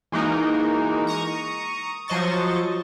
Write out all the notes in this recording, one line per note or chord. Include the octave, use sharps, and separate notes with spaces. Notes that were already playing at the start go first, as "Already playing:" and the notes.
E3 G#3 A#3 D#4 F#4 A#4
A#5 C#6 D#6
F3 F#3 C5 D#5 C#6 A6